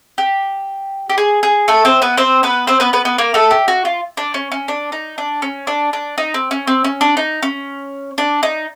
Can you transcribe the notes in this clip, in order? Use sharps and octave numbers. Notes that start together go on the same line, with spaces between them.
G4
G4
G#4
G#4
A3 A4
C4 C5
B3 B4
C4 C5
B3 B4
C4 C5
B3 B4
B3 B4
B3 B4
A#3 A#4
A3 A4
G4
F#4
F4
D4
C#4
C#4
D4
D#4
D4
C#4
D4
D4
D#4
C4
C#4
C4
C#4
D4
D#4
C#4
D4
D#4